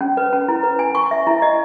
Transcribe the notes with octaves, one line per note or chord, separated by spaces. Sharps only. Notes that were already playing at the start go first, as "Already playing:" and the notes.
C#4
B4
C#4
E4
B4
G#5
C#6
E5
E4
D#5